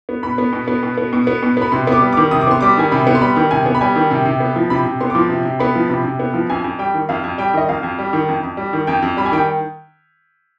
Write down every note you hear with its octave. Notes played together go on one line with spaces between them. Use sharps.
B3
B2 B5
B3
B2
B3
B2
B3
B2
B3
B2
B3 B5
C3 C6
B3 D6
G3
D6
D#3
C3 D#6
D6
B3 C6
G3 D6
D#3 G#5
C3 B5
B3
C6
G3 B5
D#3
C3 G#5
B3
B5
G3 G#5
D#3
C3
C3
B3
F3
C3 B5
C3
B3 C6
D6
F3 C6
C3
C3
B3 B5
F3
C3 B5
C3
B3
F3
F2 G#5
F2
G3 G5
D#3
F2 F5
F2
G3 G5
D#3 D#5
F2 F5
F2
G3
D#3
F2
F2
G3
D#3
F2 G5
F2
G3 B5
G#5
D#3 G5